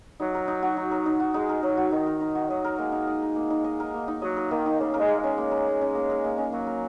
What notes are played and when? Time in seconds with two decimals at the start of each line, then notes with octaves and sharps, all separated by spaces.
0.20 F#3 D#4
0.34 A#4
0.48 D#4
0.63 F#4
0.77 D#4
0.91 A#4
1.06 D#4
1.20 F#4
1.34 G#3 D#4
1.49 A#4
1.63 F#3 D#4
1.77 F#4
1.92 D#3 D#4
2.07 A#4
2.21 D#4
2.35 F#4
2.49 F#3 D#5
2.64 A#4
2.78 G#3 A#3
2.92 D#4
3.07 D#5
3.22 A#4
3.36 A#3
3.50 D#4
3.64 D#5
3.80 A#4
3.94 A#3
4.08 D#4
4.22 F#3 D#5
4.37 A#4
4.51 D#3 A#3
4.66 D#4
4.80 C#3 A#3
4.94 A#4
5.00 G#3
5.08 A#3
5.19 G#3
5.24 C#4
5.38 A#3
5.51 A#4
5.66 A#3
5.81 C#4
5.95 A#3
6.10 A#4
6.25 A#3
6.38 C#4
6.52 F#3 A#3
6.67 A#4